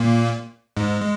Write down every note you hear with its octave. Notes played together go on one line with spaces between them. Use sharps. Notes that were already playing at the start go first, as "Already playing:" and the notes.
Already playing: A#2 A#3
G#2 G#3
G#3